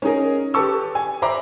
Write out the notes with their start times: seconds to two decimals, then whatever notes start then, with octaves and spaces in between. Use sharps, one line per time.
0.02 C#4 D#4 G#4 A#4
0.54 G4 A4 B4 A5 C#6 E6
0.95 G#5
1.22 C5 E5 A#5 B5 D6